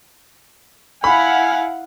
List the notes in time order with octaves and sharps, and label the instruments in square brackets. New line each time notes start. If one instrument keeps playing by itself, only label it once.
[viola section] E4 F5 F#5 [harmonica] G#5 [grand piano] B5